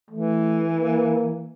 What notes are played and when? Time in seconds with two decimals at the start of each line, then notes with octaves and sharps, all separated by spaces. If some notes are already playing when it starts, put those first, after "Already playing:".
0.11 E3 A3
0.80 A#3